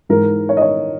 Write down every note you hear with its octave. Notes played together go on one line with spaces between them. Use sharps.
G#2 E3 G#3 A#4
C#5
D#5
C#5